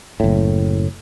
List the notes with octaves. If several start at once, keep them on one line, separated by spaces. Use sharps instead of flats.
F#1 A2